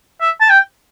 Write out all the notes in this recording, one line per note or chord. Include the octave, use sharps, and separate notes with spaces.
E5
A5
G5